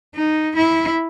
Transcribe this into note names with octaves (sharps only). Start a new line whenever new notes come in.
D#4
E4